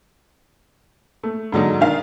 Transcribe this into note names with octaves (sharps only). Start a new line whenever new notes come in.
A3
G#2 D3 F#3 D#4
D#3 D4 F5